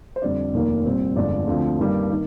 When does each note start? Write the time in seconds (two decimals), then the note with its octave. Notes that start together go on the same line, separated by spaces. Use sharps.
0.16 C5
0.22 F2 D3 G3 C4 D5
0.54 F1 D#2 D#3 A#3
0.85 C2 A#2 G3 C4
1.16 G1 F2 D3 G#3 D5
1.47 D2 D3 F3 C4
1.79 G2 D#3 G3 A#3
2.11 D#3